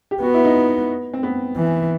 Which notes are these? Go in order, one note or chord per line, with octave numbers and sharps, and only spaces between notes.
G4
B3 F#4
E4
D#4
C4
B3
E3